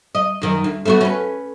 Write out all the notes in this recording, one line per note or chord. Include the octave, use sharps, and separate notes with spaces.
D#5
F#2 D#3
D2
A3 B3 F#4
C#4 B4